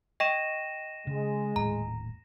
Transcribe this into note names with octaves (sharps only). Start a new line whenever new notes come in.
D#5 G5 C#6 A#6 D#7 E7
C#3 G#3
D#1 A2 A#5